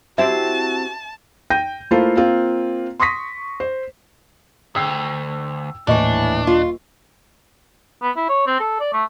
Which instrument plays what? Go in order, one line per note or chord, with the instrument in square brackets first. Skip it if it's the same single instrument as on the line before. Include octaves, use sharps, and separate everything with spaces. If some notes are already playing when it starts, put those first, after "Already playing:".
[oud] C4 E4 G4 [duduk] F#4 [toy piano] E5 [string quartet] A5
[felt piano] G5 G6 A#6 D#7
A3 A#3 E4 F4 A4 C5
A#3 C4 F4
C6 C#6 D#6 A#6 B6
C5
[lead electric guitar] D2 [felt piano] G5 E6 C7
[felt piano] D#1 D#5 C#6 [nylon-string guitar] A2 E3 [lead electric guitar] D4
[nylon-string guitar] F4
[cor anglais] B3
E4
C#5
C4
A4
D5
A3